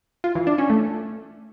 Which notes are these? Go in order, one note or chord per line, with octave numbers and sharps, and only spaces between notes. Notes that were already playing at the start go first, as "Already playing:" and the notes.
F4
E3
D4
C#4
A3